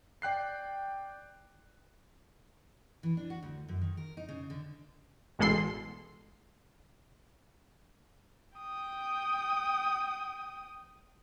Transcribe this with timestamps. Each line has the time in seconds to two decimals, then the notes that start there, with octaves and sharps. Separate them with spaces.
0.22 D5 G5 F#6 C7
3.03 E3
3.17 D4
3.30 F#4
3.43 D2
3.68 F#2
3.81 D#3
3.97 A#4
4.17 D#4
4.29 C#3
4.50 D3
5.39 A1 B2 G#3 A4 C6 C7
8.58 G5 D#6